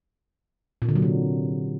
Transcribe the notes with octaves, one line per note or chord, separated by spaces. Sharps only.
A#2
D3
F#3
C3